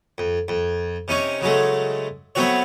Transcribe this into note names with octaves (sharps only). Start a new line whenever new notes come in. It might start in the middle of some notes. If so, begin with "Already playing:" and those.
F2
F2
C3 C#4 D#4 C#5
C#3 F#3 G#3 A3
F#3 A3 B3 C4 F#4 C#5